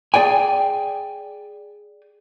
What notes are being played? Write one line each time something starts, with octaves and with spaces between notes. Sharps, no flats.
G#4 D5 G5 G#5